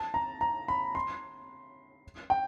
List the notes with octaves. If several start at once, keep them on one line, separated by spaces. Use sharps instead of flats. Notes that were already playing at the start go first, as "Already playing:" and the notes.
Already playing: A5
A#5
A#5
B5
C6
G5